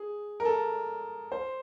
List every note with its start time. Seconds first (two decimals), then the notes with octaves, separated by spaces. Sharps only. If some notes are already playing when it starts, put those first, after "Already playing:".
Already playing: G#4
0.40 A#4
0.45 A4
1.32 C5